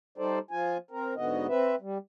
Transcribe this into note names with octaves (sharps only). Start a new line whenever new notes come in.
G3 D#4 A4 C5 D5
F3 F4 G#5
C4 A#4
G#2 D3 B3 F#4 D#5
C4 B4 E5
G3